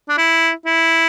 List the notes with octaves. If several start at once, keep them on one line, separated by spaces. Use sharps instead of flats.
D4
E4
E4